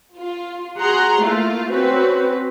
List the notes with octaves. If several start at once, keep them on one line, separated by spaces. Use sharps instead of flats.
F4
F#4 G#4 F#5 A#5 C6
A3 A#3 E4 F4
C4 C#4 F#4 B4